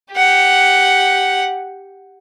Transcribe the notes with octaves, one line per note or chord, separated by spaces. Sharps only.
G4 F#5